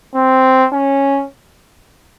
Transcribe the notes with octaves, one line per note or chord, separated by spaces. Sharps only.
C4
C#4